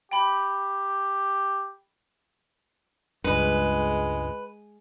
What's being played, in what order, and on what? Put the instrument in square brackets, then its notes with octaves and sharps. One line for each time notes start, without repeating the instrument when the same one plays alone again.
[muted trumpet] G4 [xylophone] G5 B5
[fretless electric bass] C#2 G2 [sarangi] G#3 [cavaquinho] B4